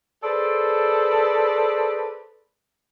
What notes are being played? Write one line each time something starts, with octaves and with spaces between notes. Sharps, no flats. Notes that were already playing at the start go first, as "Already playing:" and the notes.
G#4 A4 B4 C5 D5